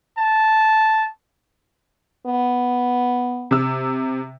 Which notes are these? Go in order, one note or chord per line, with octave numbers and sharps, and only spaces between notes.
A5
B3
C3 E6